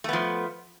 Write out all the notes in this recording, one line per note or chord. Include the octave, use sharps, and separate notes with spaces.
F3 A3 B3